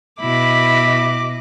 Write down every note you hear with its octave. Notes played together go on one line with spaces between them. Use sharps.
B2 E4 D#5 B5 D6